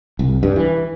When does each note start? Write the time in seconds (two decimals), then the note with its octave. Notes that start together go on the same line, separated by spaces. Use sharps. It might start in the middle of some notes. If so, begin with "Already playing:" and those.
0.19 C2
0.43 G2
0.56 E3